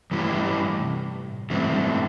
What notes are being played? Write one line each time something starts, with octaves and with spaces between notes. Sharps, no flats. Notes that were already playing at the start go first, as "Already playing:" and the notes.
G2 E3 A3 E4 G4
G2
G3
C3
A2
G2 E3 A3 C4
G2